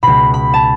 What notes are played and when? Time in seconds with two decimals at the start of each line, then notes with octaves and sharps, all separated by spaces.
0.03 C#2 B2 B5
0.34 B5
0.54 A5